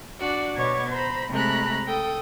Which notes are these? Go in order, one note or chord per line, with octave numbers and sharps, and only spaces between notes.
D4 F#4 D5
B2 B3 C#5 D6 G#6 A6
C5 A#5 B5
C3 G#3 A3 A#5 B5 F#6
A4 G5 D#6